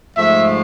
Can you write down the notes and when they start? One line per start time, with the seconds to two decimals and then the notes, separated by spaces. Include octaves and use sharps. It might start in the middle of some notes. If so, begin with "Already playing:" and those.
0.17 G#2 F3 A3 E5